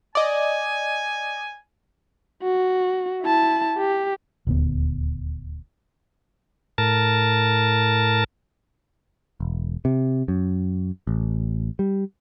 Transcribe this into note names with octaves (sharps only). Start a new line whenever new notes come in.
D5 D#5 G#5
F#4
E4 A5
G4
D#1 D2 B3
A2 A#4 A5
E1
C3
F#2
A1
G3